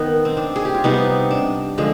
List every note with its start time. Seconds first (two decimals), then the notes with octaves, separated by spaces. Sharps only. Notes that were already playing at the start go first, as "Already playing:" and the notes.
Already playing: D#3 B3
0.25 C4
0.37 D4
0.56 G#4
0.65 G4
0.74 F4
0.84 C3 G3 B3 D#4
1.31 D4
1.78 D3 F3 G#3